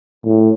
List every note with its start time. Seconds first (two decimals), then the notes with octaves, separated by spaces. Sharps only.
0.25 A2